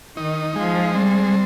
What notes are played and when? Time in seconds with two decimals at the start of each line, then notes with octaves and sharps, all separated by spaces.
0.17 D#3 D#4
0.56 F3 G#3
0.95 G3 C4